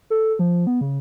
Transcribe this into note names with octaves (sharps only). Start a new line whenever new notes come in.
A4
F3
B3
C#3